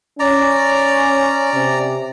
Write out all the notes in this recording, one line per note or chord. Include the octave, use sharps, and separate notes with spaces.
C#4 D5 A#5
C3